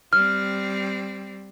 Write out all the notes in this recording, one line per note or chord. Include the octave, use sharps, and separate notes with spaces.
G3 C4 F6